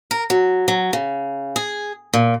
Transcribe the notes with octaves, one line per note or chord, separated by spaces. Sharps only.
A#4
F#3
F#3
C#3
G#4
A#2